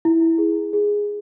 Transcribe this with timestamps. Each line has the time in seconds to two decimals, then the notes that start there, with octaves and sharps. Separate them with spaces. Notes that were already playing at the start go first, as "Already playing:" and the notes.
0.05 E4
0.38 G#4
0.73 G#4